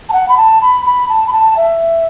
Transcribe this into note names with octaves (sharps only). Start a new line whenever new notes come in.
A5
F#5
B5
A5
B5
B5
A5
B5
A5
E5